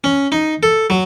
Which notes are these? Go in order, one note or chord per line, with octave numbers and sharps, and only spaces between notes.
C#4
D#4
A4
F#3